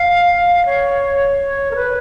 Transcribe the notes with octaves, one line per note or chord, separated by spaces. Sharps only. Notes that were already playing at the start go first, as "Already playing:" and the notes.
Already playing: F5
C#5
A#4
B4